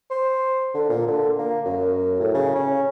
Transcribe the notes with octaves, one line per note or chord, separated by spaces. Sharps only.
C5
D3
A#2
D3
A#3
F#2
A2
C#3
C#4